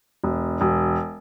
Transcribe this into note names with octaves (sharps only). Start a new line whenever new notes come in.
E1
E1